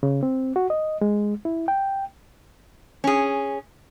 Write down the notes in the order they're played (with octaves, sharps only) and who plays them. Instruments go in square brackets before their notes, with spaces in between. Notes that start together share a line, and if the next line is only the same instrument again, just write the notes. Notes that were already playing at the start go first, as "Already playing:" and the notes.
[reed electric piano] C#3
C4
F#4
D#5
G#3
E4
G5
[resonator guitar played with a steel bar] C#4 G#4